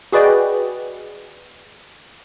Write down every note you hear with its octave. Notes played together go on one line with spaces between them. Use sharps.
F#4 G#4 B4 D5 D#5 G5